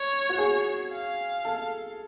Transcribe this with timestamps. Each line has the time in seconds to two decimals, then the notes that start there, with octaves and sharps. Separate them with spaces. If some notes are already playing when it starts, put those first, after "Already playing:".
Already playing: C#5
0.29 F#4
0.38 G#4
0.92 F5
1.45 A4